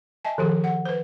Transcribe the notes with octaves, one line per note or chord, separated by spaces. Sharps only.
D#5 E5 G#5 A5
D#3 F3 G4 G#4
F#5
B4 C5